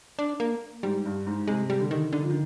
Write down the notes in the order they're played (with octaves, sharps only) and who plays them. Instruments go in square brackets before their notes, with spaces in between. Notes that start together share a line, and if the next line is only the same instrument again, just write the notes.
[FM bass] D4
A#3
[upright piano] G#2 [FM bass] G3
[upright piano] G2
G#2
[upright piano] C3 [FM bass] G#3
[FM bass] G3
[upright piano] D3
[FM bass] D#3
[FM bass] D3 [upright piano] D#3
[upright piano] F3
D#3